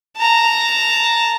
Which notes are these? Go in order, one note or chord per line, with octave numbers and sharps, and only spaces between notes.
A5 A#5